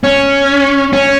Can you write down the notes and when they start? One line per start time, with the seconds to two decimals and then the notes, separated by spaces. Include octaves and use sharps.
0.04 C#4
0.93 C#4